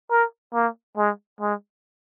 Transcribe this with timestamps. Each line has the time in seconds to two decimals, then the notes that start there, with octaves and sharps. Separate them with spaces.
0.11 A#4
0.54 A#3
0.98 G#3
1.41 G#3